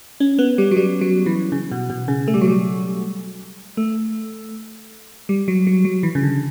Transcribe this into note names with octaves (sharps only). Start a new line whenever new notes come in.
C#4
B3
G3
F#3
G3
F#3
E3
C#3
B2
B2
C#3
A3
G3
F#3
G3
A3
G3
F#3
F#3
F#3
E3
C#3
D3